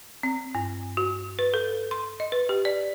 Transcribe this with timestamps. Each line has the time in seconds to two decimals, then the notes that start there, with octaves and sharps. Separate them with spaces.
0.23 C4
0.55 G2
0.97 F#4
1.39 B4
1.54 A4
1.91 C6
2.20 D#5
2.32 B4
2.49 G4
2.65 D5